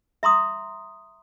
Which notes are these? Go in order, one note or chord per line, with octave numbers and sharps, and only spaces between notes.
E5 A#5 C6 D#6